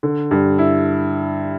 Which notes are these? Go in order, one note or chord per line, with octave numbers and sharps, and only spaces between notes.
D3
G2
E4